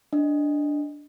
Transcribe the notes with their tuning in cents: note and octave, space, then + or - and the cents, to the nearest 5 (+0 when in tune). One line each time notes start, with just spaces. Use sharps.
D4 +0 D#5 +0